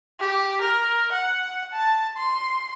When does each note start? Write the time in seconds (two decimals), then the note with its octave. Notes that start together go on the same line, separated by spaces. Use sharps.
0.20 G4
0.61 A#4
1.12 F#5
1.73 A5
2.17 C6